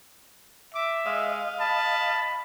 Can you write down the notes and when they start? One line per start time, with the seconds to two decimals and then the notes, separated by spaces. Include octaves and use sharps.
0.74 E5 D6
1.06 G#3 D#5 F5
1.61 A5 B5